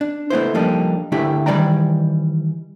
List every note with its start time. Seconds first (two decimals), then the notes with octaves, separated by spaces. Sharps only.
0.01 D4
0.30 A3 B3 E4 C5
0.54 F3 G3 A#3 D4 D#4 A4
1.12 D3 A3 D4 E4 G4
1.46 D#3 E3 G3 D5 G5 A#5